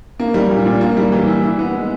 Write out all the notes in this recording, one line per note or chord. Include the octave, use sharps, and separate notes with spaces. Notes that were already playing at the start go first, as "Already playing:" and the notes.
A#3
G3
A#2
A#2
A#3
G3
E3
E4
E4
B3
G#3